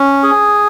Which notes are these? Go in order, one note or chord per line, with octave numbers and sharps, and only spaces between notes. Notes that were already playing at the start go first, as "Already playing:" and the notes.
Already playing: C#4
G#4